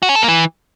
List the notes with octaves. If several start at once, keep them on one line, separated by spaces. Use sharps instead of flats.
F#4
C#4
A4
A#3
E3